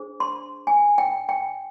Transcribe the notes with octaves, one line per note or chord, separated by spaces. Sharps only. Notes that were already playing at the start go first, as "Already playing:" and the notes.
Already playing: D4 G#4 C5
C6
G#5
G5
G5